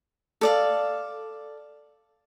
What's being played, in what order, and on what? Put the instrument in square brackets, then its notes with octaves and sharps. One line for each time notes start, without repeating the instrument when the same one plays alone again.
[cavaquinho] A4 D5 F5